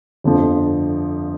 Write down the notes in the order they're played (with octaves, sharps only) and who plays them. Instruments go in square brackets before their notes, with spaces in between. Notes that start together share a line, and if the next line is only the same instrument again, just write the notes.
[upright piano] G1 F2 D3 F3